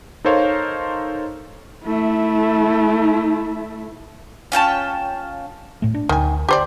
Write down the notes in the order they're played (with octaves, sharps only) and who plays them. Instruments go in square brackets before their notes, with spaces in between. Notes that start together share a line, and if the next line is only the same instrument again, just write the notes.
[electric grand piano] D#4 A4 A#4 C5 C#5 F5
[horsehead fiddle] A3 E4
[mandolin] C#4 F4 G5 A5
[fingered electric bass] A2 A3
D4
[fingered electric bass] D2 [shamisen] D#3 G#5
[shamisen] G4 C5 D5